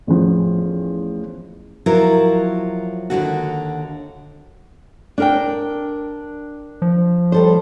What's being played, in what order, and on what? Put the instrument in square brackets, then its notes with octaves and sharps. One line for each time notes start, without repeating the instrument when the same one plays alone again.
[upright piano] A1 E2 F3
[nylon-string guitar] F3 F#3 E4 A#4
D#2 G#2 D3 F#4
D4 A#4 G5
[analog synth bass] F3
[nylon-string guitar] G3 A4 C5